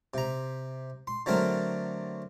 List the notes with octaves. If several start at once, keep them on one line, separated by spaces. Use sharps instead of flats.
C3 A#5
C6
D3 F#3 A3 C4 A4 A#4